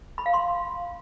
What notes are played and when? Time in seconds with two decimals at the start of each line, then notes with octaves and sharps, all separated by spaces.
0.18 B5
0.26 F5
0.34 C6